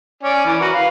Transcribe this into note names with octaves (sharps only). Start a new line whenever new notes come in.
C#4 D5 G#5
E3
F#4 A#4 B4
B4 F5